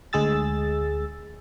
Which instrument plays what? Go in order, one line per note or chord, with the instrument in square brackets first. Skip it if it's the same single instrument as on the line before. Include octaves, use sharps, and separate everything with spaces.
[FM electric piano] D2 G#3 G#4 E6 A6